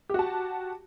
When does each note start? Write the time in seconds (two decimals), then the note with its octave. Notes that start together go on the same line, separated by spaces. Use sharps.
0.10 G4
0.14 F#4
0.19 A5